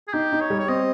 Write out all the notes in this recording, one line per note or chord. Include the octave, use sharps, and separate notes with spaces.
G#4
D#4 G4
D#4
C#5
G3
C#5
C4 D#5